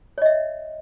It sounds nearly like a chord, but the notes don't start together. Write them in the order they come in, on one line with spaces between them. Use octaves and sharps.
C#5 D#5 E5